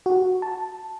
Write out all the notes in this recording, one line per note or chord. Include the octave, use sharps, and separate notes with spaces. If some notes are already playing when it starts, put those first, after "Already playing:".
F#4
A5